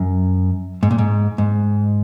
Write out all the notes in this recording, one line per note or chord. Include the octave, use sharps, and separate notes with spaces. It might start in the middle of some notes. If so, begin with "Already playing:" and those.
Already playing: F#2
G#2
A#2
G#2
G#2